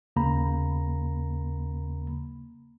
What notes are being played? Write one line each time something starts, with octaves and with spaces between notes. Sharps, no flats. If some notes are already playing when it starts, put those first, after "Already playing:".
D#2 C#3 A#3 A#5 B5